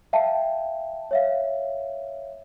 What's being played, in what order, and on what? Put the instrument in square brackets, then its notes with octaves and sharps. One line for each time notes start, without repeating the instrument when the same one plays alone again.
[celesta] E5 F5 G5 A5
C#5 E5 F5